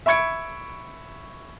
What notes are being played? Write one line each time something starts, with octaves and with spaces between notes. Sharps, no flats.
E5 B5 C#6 G#6 C#7 D7